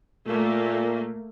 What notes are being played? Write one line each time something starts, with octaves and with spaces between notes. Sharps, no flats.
A#2 A3 A#3